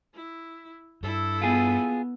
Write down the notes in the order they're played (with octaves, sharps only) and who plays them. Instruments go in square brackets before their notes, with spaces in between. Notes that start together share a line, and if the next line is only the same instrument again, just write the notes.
[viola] E4
[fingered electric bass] G2 [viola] E4 A4
[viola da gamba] B3 [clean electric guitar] F4 G#4